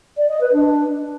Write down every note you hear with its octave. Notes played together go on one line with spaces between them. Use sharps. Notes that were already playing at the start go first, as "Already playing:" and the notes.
D5
D#5
B4
D4